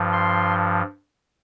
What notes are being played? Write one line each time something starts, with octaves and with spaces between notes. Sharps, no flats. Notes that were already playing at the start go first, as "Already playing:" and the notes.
Already playing: G2 F3
C6